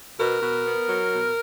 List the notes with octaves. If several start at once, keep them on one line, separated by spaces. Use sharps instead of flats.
B2 A#4
B2
B3
F#3
B2